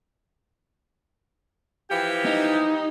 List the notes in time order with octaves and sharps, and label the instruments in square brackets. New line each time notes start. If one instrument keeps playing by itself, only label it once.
[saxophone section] E3 F3 G4
[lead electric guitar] D#4